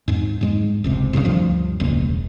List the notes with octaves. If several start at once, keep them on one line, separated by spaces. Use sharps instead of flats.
F2 G#2
G#2 G3 G#3
F1 C#2 C3
C2 G2 A#2 C#3
D2 G2 F3
E1 C#2 A#3